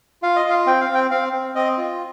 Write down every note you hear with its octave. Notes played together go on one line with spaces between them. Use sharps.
F4 F5
D#5
F4 F5
C4 G5
F5
C4
G5
C4 F5
C4
C4 D#5
F4